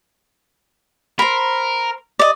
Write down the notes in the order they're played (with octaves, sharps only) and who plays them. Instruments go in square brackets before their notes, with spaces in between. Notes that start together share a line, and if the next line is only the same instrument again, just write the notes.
[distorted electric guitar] A#4 [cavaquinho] C5 B5
[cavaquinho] D5 D#5